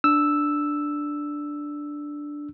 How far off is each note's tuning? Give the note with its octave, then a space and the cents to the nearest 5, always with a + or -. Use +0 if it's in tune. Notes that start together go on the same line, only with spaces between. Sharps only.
D4 +0 E6 +0